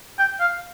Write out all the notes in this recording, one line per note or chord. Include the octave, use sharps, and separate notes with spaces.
G5
F5